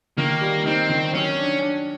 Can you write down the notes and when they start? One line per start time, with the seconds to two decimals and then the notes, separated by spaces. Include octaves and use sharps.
0.17 D#3 A#3
0.41 G3
0.66 C4 D#4
0.89 D#3
1.13 F#3 C#4
1.38 D4
1.62 D4